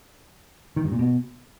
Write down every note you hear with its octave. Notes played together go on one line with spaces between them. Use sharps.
D#3
G2
A#2
B2